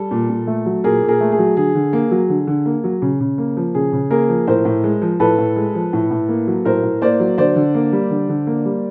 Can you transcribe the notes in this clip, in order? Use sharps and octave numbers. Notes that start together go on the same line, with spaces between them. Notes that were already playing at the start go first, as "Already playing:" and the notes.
Already playing: G3 A4
A#2
A#2
A3
F#3
A#2 G#4 A#4
A#2
G#4 A#4
A3
G#4
F#3
D3 G#4
D3
A#3
F#3
D3
D3
A#3
F#3
C#3
C#3
A#3
F3
C#3 G#4
C#3
A#3 G#4 A#4
F3
A2 A#4 C5
A2
G#3
F3
A2 A4 B4
A2
G#3
F3
A2
A2
A#3
F#3
A2 A#4 C5
A2
A#3 C5 D5
F#3
D3 C5 D5
D3
A#3
G3
D3
D3
A#3
G3